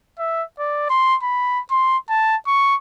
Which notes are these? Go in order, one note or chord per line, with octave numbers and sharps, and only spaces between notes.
E5
D5
C6
B5
C6
A5
C#6